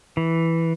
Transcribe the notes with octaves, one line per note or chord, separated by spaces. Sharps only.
E3